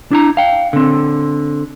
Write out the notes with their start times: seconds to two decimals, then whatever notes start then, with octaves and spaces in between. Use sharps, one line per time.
0.11 D4 E4 A#5
0.37 F5 G5
0.73 D3 C4